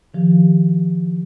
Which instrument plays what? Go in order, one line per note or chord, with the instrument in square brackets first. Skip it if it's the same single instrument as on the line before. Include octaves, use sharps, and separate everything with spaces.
[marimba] D#3 F3 G4